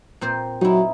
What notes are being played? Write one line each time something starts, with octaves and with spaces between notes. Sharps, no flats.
A#2 C4 C5
F#3 D#4 E4